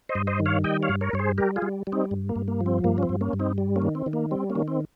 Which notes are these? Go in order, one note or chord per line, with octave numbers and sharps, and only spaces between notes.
C5 D#5
G2
C5 D#5
D#3
C#5 F5
G3 D#5 G5
C#5 F5
G2
A#4 C#5
G2 C#5
G#4 C5
G3 G4 A#4
F4 G#4
G3
G3
C4 D#4
G2
A#3
G2
A#3
F3
C4
G2 A#3
C#4
C4
G2
A#3 C#4
G2
C4 D#4
G3
A#3 C#4
D#3
C4
D#3
A#3
G3 C4
A#3 C#4
D#3
C4